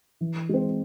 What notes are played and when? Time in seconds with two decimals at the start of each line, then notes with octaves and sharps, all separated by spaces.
0.21 E3
0.49 G#3 C4